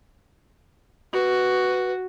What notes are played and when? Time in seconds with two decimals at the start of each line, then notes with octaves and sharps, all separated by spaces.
1.13 F#4 B4